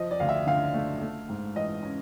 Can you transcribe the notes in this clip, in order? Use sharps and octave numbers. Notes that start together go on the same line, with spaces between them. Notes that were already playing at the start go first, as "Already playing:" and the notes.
Already playing: F3 D#5
D5
D2 F5
E5
D3 F5
A3
A3
G#2
E3 D#5
C#4